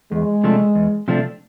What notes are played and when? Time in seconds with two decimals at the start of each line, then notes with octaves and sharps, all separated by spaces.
0.12 E2 G#3
0.44 C3 F3 A3 D4
0.75 E2
1.08 C3 F3 A3 D4